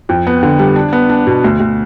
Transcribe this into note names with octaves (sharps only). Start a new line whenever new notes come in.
F2
B3
D3
G3
D4
B3
D4
B2
D2
D2